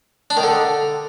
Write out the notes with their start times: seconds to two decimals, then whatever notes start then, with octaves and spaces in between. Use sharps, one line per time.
0.30 D4
0.37 D#3
0.43 D3